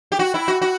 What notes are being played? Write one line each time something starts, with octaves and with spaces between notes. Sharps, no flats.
G4
F#4
E4
F#4
F#4